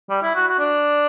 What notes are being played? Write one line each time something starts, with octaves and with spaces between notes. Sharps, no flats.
G3
E4
F#4
F#4
D4